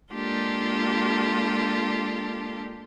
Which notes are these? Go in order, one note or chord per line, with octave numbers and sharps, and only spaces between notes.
G#3 A#3 D4 F4 G4 A4